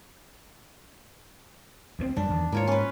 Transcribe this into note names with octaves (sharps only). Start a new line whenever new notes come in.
D2 G3 C4
F#2 G3 D4
E2 D#3
G#2 A#3 F4 C#5
C#4 B4